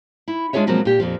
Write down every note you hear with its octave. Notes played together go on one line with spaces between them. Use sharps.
E4
G#3 D4 F4 G#4 C#5 E5
B2 F3 F#3 G#3 A#3 C4
A#2 G4
F2 A#2 F3